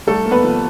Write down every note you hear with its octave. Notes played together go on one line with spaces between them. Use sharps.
C2 A3 A4
A#3
B3 B4
F3